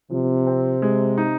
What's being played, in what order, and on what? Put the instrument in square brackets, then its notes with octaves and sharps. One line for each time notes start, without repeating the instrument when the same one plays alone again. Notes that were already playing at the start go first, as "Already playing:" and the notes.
[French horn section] C3 [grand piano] F3
[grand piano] C4
G#3
D#4